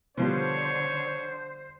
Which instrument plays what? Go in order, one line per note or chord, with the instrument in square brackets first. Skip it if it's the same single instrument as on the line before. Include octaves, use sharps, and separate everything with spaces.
[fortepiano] B2 F3 G3 [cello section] D3 [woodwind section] C5 [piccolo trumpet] C#5